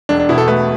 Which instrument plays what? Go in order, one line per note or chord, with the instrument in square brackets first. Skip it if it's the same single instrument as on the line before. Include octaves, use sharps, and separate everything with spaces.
[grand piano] E1 [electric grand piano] D4
[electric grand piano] D4
[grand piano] B2 [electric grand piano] E4
[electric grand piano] A4
[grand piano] A3 [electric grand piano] B4